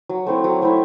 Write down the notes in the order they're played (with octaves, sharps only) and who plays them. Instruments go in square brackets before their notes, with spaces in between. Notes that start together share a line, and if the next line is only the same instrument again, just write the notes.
[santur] F#3
A3 C4 E4
F#3
A3 C4 E4